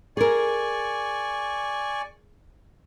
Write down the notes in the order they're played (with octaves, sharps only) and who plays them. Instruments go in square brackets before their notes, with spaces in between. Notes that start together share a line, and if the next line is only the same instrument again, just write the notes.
[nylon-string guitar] G#4 A#4 [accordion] D5 G#5 C#6